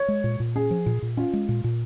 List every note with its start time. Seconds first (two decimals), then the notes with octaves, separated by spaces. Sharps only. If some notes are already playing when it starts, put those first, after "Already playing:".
Already playing: C#5
0.08 G#3
0.24 A#2
0.40 A#2
0.55 C#4 G#4
0.71 F3
0.86 A#2
1.02 A#2
1.17 C#4 F4
1.33 G#3
1.49 A#2
1.64 A#2